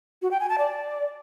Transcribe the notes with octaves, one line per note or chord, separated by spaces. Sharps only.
F#4
G5
G#5
A5
D5